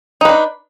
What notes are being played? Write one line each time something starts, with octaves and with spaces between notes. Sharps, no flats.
D4 D#4 B4